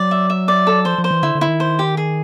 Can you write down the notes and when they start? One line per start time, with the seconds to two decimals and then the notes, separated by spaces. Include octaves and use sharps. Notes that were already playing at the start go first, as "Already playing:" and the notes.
Already playing: F#3 D5
0.11 E5
0.30 E5
0.48 D5
0.67 A4
0.85 F3 C5
0.98 F3
1.04 C5
1.11 E3
1.23 D3 E4
1.35 D3
1.41 E4
1.47 D#3
1.60 C5
1.79 G4
1.97 G#4